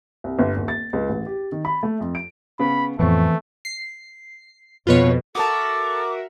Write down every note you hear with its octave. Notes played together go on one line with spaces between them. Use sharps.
C2
G1
D#1
A6
C#2
A1
G4
D#3
B5
A3
F2
D7
C#3 B3 B5
F2 A2 E3 A3 B3 C4 C#6
C7
F2 B2 F4 B4 C#5
F#4 A4 A#4 E5 A5 D6 D#6